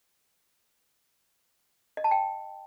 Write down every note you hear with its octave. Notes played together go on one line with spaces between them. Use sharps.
D#5
A5
G5